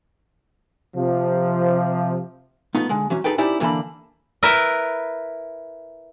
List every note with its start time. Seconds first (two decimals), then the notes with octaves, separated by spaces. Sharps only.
0.95 C3 F3
2.75 A3 B3 D#4 F4
2.89 D3 G#3
3.10 E3 F#3 C#4
3.24 D#4 G#4 A4 B4 G5
3.38 C#4 D#4 E4 G4 C5 D5
3.60 D3 E3 A#3 A5 B5
4.43 E4 A#4 B4 E5